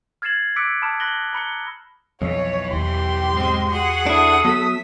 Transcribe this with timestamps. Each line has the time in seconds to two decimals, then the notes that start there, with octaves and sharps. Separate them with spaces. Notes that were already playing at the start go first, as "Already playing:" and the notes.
0.22 F6 G#6 A6 C7 E7 F#7
0.56 D6 E6 F#6 B6 C#7 D7
0.82 A5 B5 D#6 F6 E7
1.00 B5 F#6 A#6 F#7 G7
1.33 A#5 B5 C#7 G7
2.22 B1 F2 E3 C#5
2.73 E2 G4 C6
3.34 G#2 G#3 C4
3.69 F#4 G#4 F#5
4.07 D4 E4 A4 D#6
4.45 F#3 B3 E5